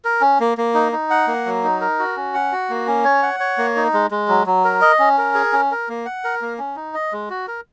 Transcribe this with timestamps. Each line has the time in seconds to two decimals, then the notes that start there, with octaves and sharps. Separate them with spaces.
0.05 A#4
0.21 C#4
0.40 A#3
0.58 A#3
0.74 D#4
0.92 D#4
1.10 F#5
1.28 A#3
1.46 F#3
1.63 D#4
1.81 A#4
1.99 F#4
2.16 C#4
2.34 F#5
2.52 F#4
2.70 A#3
2.87 C#4
3.05 C#5
3.23 F#5
3.40 C#5
3.58 A#3
3.76 D#4
3.94 G#3
4.11 G#3
4.28 F#3
4.46 F#3
4.64 A#4
4.81 D#5
4.99 C#4
5.18 A#4
5.35 G#4
5.53 C#4
5.71 A#4
5.89 A#3
6.06 F#5
6.24 A#4
6.42 A#3
6.59 C#4
6.76 D#4
6.94 D#5
7.13 G#3
7.30 F#4
7.48 A#4